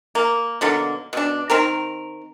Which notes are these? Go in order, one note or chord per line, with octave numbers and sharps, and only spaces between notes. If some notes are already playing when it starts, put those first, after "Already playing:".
A#3
B2 D3 F#3 A#3
B2 D4
D#3 C4 A#4